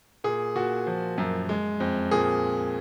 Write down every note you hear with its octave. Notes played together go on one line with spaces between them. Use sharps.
A#2 G#4
A#2 F#4
F3
F#2
G#3
F2
A#2 G#4